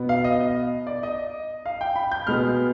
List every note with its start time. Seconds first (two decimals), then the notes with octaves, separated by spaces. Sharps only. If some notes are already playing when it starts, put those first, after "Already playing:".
Already playing: B2 B3
0.09 F5
0.24 D#5
0.40 D#5
0.87 D5
1.03 D#5
1.66 F5
1.81 G5
1.96 B5
2.12 G6
2.27 B2 G#3 B3 F6